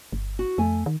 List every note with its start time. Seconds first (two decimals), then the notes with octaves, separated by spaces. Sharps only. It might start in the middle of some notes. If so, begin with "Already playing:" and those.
0.13 G1
0.39 F#4
0.58 F2 A3 G#5
0.86 D#3